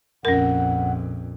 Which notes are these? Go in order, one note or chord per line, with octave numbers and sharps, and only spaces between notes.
A#1 F2 C#4 A#4 F#5